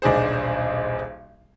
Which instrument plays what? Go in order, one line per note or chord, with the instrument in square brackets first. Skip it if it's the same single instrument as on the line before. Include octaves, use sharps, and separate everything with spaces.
[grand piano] D#1 B1 D4 G#4 C5